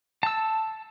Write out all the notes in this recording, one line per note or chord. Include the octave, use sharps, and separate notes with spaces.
A5 E6